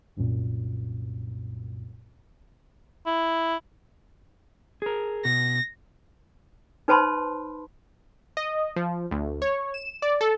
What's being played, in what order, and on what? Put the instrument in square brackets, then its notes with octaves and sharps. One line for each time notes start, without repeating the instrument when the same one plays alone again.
[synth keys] C2 F#2 A#2
[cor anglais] E4
[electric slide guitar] G#4 A#4
[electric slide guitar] B2 [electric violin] A#6
[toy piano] D#4 B4 C5 A5 B5 C6
[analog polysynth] D#5
F3
D2
C#5
E7
D5
A4